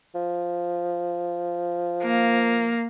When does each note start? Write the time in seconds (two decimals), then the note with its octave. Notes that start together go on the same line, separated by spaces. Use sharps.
0.15 F3
2.04 A#3